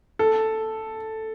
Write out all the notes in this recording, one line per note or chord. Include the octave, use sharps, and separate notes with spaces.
A4